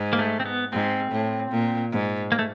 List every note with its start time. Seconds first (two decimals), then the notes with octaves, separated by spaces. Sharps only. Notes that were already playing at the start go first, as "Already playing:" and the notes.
Already playing: G#2
0.13 A#3
0.19 A3
0.40 C4
0.46 B3
0.72 G#2 C4
1.12 A2
1.51 A#2
1.91 G#2
2.32 A#3
2.39 A3